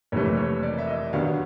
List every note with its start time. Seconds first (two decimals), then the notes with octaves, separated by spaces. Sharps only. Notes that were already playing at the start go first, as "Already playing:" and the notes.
0.12 F#1 F2 C3 E3 A3 C#5
0.37 C#5
0.63 D5
0.78 E5
0.87 D#5
1.13 D#2 D#3 F#3 B3 D4 F5